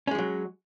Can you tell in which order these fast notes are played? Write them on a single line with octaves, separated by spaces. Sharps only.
C#4 G#3 F3 F#3